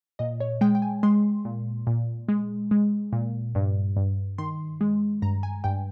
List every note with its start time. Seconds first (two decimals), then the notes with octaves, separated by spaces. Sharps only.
0.19 A#2 D#5
0.40 C#5
0.61 G#3 G5
0.75 G5
0.82 G#5
1.03 G#3 C6
1.45 A#2
1.87 A#2
2.28 G#3
2.71 G#3
3.13 A#2
3.55 G2
3.97 G2
4.38 D#3 C6
4.81 G#3
5.22 G2 A#5
5.43 G#5
5.64 G2 G5